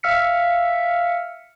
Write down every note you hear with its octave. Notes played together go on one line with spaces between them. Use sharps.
E5 F5 E6 F6 B6 C#7